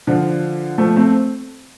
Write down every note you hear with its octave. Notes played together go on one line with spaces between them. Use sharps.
D3 F3
F3 A3
A3 C4